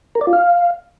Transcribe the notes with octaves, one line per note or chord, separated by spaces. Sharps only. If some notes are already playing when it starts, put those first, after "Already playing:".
A#4
D5
F4
F5